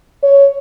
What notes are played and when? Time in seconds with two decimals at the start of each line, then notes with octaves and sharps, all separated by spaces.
0.23 C#5